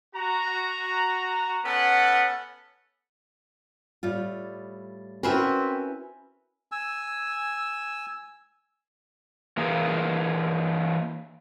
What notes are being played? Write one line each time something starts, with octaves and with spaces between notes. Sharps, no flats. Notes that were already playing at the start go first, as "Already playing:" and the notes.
F#4 A#5
B3 C#4 A4 C#5 F#5
A2 G3 F4
C4 C#4 E4 F#4 A#4 B4 E5
G#5 E6
E3 A#3 G#4